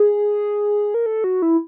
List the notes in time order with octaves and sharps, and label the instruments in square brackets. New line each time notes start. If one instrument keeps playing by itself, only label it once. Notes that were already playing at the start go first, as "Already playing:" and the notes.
Already playing: [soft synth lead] G#4
A#4
A4
F#4
E4